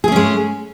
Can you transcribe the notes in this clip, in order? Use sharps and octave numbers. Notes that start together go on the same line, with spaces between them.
G#3 A3 C#4 G#4